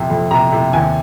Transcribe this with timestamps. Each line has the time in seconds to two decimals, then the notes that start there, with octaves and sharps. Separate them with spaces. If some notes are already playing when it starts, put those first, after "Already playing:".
Already playing: F2 C3
0.10 F2
0.31 C3 A#5
0.52 C3
0.73 D#2 G#5